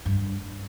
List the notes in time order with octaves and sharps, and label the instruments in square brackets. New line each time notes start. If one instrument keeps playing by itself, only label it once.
[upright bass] G2